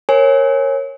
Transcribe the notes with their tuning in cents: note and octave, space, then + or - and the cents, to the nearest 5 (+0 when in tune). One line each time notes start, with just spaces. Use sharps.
A#4 +0 C#5 -20 G#5 +0